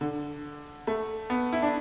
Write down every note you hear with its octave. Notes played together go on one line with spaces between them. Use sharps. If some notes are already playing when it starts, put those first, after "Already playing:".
D3
A3
B3
E4
D4